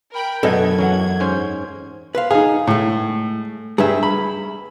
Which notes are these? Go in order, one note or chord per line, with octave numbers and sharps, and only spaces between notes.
A#4 G5 B5
F#2 B2 D3 B3 A4 D#5 F#5 G#6
E2 F#3 C#4 F#5
G#2 C#4 C5
B4 C5 F5
D#4 G#4 F5
A2 G#3 A3
G2 G#4 B4 E5
B5